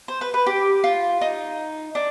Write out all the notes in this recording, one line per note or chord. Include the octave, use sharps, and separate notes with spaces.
C5
B4
B4
G4
F4
D#4
D4